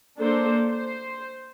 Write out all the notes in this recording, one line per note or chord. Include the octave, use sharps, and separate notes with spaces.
A#3 D4 A4 C5
C5